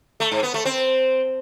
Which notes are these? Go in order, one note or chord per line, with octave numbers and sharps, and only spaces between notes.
A3
G#2
B3
A3
C4